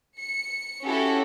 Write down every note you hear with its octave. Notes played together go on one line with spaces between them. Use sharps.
C#7
C#4 E4 F#4 G4 A4